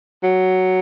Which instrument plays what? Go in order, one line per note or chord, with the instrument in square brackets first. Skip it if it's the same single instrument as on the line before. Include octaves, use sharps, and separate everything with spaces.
[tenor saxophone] F#3